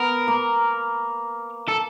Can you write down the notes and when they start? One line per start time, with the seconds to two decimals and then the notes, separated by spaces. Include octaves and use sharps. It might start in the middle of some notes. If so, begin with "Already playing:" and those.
Already playing: B3 A#4
0.28 A#3
1.68 A4